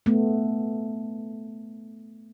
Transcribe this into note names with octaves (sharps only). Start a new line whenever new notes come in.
A3 B3